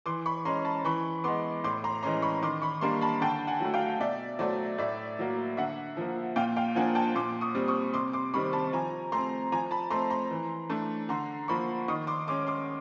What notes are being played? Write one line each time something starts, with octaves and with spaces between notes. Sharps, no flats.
E3 C6 D6
B5 C#6
G#3 C#4 A#5 C6
A5 B5
E3 B5 C#6
G#3 B3 C6 D6
A2 C6 D6
A#5 C6
E3 G#3 C#4 A#5 C6
B5 C#6
D#3 C6 D6
B5 C#6
G3 A#3 D4 A#5 C6
A5 B5
D3 G5 A5
F#5 G#5
F#3 A3
F5 G5
B2 D5 E5
F#3 A3 C5 D5
A2 D5 E5
F#3 A#3
D3 E5 F#5
F3 A#3
A#2 F5 G5
F5 G5
F3 A#3 D4 F#5 G#5
G5 A5
A#2 C6 D6
C#6 D#6
G3 C4
C#6 D#6
C3 C6 D6
C6 D6
D#3 G3 C4 B5 C#6
A5 B5
F3 G#5 A#5
A3 C4 A#5 C6
F3 G#5 A#5
A5 B5
A3 C4 A#5 C6
A#5 C6
E3
A3 D4
D3 A#5 C6
F3 A#3 B5 C#6
D#3 C#6 D#6
C6 D6
G#3 C#4 C6 D6
C6 D6